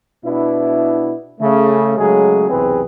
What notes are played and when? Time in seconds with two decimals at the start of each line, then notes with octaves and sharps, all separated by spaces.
0.24 B2 B3 D4 E4
1.40 C#3 A3
1.98 C#3 F#3 G#3 A3 G#4
2.49 B1 E2 C3 C4 G#4 B4